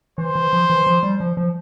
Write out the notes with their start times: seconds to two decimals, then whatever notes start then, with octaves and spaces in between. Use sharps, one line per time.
0.18 E3 C5
0.35 E3
0.53 F3
0.70 E3
0.87 F3
1.03 G3
1.20 F3
1.37 F3